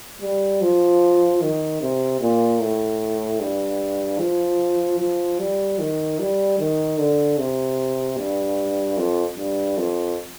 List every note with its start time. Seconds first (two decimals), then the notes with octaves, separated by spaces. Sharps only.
0.22 G3
0.62 F3
1.41 D#3
1.82 C3
2.21 A#2
2.60 A2
3.40 G2
4.20 F3
4.99 F3
5.39 G3
5.79 D#3
6.19 G3
6.59 D#3
6.98 D3
7.38 C3
8.17 G2
8.98 F2
9.37 G2
9.77 F2